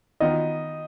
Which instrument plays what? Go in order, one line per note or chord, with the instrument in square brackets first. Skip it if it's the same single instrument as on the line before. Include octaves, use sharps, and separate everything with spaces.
[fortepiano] D#3 B3 F4 [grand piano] D#5